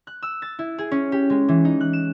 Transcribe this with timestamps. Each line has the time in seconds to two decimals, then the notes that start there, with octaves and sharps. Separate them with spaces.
0.07 F#6
0.23 E6
0.42 A6
0.59 E4
0.78 G#4
0.91 C#4
1.12 G4
1.30 G#3
1.48 E3
1.65 D#4
1.81 F#6
1.93 E7